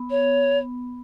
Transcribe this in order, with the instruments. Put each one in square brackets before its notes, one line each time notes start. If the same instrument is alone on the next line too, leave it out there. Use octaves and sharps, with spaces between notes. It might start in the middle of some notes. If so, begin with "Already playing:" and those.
Already playing: [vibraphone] B3
[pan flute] C#5